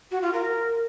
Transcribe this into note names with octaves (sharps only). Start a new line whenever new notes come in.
F#4
F4
A#4